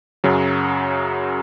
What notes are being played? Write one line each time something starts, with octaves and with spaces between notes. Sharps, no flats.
F#2 C#3 F#3